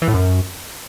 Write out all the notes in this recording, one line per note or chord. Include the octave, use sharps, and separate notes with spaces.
E3
A2
F#2